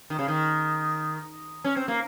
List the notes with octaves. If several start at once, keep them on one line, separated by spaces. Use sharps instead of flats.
D#3
C#3
D#3
C#4
C4
A#3